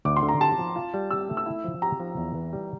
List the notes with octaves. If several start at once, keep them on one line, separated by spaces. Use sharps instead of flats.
D2 D6
C6
D3
A#5
G4 A5
F3
F4
G3
G4 E6
A3
E6
E4
F3
G4 A#5
F3
E2
E3
G3